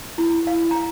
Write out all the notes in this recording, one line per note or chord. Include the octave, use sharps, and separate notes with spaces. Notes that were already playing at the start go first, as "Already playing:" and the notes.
E4
F5
A#5